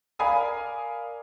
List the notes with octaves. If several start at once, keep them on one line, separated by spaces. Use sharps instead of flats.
A#4 D5 F5 G#5 B5 D#6